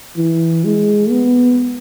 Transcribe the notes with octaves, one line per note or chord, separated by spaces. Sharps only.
E3
G#3
B3